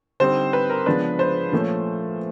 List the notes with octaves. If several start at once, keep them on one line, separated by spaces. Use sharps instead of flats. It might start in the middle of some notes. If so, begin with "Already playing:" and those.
D3 G3 C4 D#4 C5
B4
A#4
C#3 F3 G#3 B3 D4 B4
C5
A#2 F3 A3 C#4